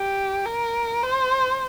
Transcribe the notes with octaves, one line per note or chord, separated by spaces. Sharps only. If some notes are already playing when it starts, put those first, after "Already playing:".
Already playing: G4
A#4
C5